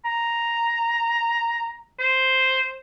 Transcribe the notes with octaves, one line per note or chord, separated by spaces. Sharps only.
A#5
C5